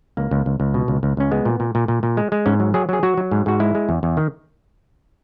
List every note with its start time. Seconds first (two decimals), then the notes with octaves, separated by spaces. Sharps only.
0.17 C#2 A#3
0.31 C#2
0.46 C#2
0.60 C#2
0.74 B2
0.88 C#2
1.03 C#2
1.17 C#2 C#4
1.32 G#3 B3
1.45 A#2
1.60 A#2
1.75 A#2
1.88 A#2
2.03 A#2
2.17 G#3
2.32 G#3
2.46 G#2 C#4
2.60 F#3
2.74 F#3 G#4
2.89 F#3 G#4
3.03 F#3 F#4
3.17 F#3
3.31 G#2
3.46 G#2 F#4
3.60 G#3 E4
3.75 G#3
3.89 E2
4.03 E2
4.17 D#3